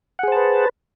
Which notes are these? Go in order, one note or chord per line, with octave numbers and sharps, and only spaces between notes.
G#4 B4 C5 F#5 A5